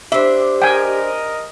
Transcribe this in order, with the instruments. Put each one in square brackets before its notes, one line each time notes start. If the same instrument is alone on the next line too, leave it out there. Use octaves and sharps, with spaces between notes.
[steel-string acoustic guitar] D4 C5 [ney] G4 [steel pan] E5
[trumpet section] A#4 D#5 [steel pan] G5 G#5